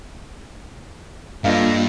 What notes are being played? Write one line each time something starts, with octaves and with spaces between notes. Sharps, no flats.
G2 A#3 D4 F4 A4 D5 D#5 F5